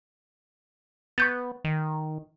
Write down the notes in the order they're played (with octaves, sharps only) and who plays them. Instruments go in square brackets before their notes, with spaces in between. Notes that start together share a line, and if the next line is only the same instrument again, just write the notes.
[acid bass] B3 [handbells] C#6 G6 A6
[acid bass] D#3